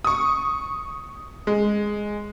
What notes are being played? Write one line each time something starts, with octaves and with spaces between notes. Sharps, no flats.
C#6 D#6
G#3